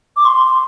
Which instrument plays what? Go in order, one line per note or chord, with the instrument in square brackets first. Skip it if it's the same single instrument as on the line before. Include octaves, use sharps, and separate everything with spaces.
[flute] D6
C6